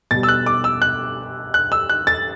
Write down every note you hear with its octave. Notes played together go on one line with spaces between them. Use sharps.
B2 G3 A6
E6
F#6
D6
E6
F#6
F#6
E6
F#6
A6